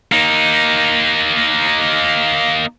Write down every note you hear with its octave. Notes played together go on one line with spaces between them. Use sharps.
A#3 D#4